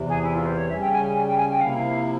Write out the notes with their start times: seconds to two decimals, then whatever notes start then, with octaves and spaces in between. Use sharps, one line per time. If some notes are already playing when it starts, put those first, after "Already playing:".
Already playing: E2 C3 E3
0.08 G#4
0.23 E4
0.35 F4
0.46 C5
0.57 C#5
0.69 C#3 G3 C#4 E5
0.81 G5
0.92 G#5
1.15 G#5
1.27 G5
1.38 G#5
1.50 G5
1.60 C3 F3 A#3 E4 F5